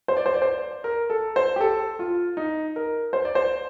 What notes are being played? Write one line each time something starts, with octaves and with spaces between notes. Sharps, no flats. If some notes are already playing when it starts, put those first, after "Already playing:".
C5
D5
C5
D5
C5
A#4
A4
C5
G4
A4
F4
D#4
A#4
C5
D5
C5